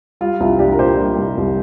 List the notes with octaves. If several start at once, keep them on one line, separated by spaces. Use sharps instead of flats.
G3 F4
C2 F4
C2 D4 G4
A#4
A#2 G4 C5
G3
C2
C2